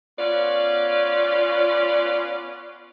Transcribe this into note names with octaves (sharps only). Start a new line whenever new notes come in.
B3 C#4 F4 D5